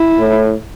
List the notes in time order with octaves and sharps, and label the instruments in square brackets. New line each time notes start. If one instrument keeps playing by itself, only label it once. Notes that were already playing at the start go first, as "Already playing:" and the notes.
Already playing: [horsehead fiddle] E4
[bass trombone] A2